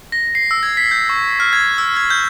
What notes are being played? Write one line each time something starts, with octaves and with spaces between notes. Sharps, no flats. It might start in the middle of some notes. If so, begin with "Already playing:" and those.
A#6
C7
E6
G#6
B6
G6
C#6
F6
G#6
E6
G#6
G6